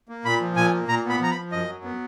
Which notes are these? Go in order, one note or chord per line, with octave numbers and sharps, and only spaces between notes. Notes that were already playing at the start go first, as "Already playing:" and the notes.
A#3
A#2 B5
F3
A#2 G#5
A#3
A#2 A#5
B3
B5
F3 A#5
B5
F3
F#2 D#5
F#3
B3